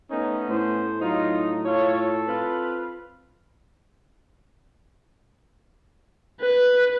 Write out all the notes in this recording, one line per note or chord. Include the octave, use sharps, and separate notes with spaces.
A3 B3 C#4 D#4
A2 C5
F#3 D#4 F4
F4 A4 C#5
C4 F4 B4
B4